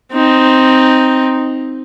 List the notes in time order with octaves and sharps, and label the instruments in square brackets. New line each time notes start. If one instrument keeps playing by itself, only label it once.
[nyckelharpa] C4 D#4